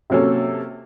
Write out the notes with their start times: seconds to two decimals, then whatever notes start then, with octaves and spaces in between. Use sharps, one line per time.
0.10 C3 F#3 A#3 C#4 A4